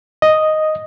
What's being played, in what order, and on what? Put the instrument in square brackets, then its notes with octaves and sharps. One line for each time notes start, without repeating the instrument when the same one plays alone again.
[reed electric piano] D#5